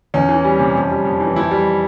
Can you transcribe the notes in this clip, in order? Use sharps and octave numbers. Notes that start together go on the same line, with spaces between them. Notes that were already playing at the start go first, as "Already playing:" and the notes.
E2 C#4
E3
G3
C3
F2
G3
F2
E3
F2 E4
G3